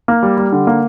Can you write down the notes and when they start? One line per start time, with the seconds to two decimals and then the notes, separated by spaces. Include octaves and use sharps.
0.08 A#3
0.23 G3
0.37 G3
0.52 D3
0.67 A#3